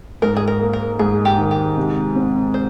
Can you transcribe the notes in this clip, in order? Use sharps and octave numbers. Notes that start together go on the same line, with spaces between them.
G#2 A#4
G#4
A#4
A#3
A#4
G#2 G#4
G4
D#3
G4
C3
C4
C5